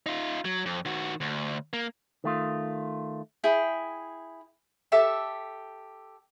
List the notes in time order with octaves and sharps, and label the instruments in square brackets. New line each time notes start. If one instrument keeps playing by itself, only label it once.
[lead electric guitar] D#4 F4
F#3
F2
D#3 F#4
D2
A#3
[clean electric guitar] D#3 A3 F4
[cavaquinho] E4 G#4 G5
G4 A4 E5 D6